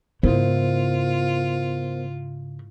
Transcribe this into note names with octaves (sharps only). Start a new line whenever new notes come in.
G#2 C#3 B3 E4 F4 A#4 C5 C6